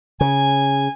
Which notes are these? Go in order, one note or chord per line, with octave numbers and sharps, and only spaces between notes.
C#3 G#5